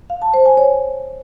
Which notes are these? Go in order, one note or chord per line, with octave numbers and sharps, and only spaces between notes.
F5
A5
C5
G#5
C#5